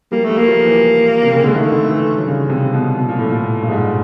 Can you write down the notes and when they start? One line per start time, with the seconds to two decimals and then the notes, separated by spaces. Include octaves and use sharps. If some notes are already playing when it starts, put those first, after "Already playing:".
0.12 G3 A#3
0.24 A3
0.30 G3
0.37 A#3
0.48 F3
0.65 E3
1.23 C3
1.33 C#3
1.44 D3 G#3
1.54 D#3 A3
1.72 D3
1.90 E3
2.19 F#3
2.26 C#3 G3
2.49 C3
2.73 B2
2.97 B2
3.09 A#2
3.19 A2
3.30 A#2
3.62 G2
3.68 G#2 G3